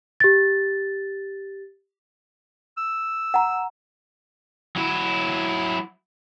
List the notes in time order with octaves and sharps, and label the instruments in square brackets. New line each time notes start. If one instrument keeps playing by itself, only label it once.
[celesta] G4 A6
[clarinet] E6
[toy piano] F#5 A#5
[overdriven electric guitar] F#3 E4